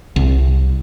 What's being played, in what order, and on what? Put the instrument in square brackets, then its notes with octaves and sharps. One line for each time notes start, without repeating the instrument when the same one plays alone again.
[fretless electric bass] C2